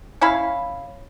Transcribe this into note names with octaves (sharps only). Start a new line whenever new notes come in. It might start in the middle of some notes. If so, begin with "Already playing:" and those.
C#4 E4 F5 B5